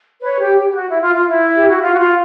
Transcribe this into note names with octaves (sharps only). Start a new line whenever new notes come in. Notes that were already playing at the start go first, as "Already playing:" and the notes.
B4 C#5
G4
G4
G4
F#4
E4
F4
F4
E4
G4
F#4
F4
F#4
F4